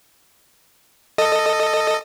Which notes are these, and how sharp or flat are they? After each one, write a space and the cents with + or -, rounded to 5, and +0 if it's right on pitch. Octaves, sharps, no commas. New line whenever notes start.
A4 +10 D#5 -5